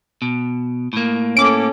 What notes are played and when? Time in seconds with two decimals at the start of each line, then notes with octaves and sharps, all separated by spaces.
0.22 B2
0.93 A2 A#3
1.37 C#4 A4 D6 D7